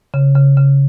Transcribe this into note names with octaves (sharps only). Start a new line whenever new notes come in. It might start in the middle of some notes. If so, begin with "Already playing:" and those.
C#3
C#3
C#3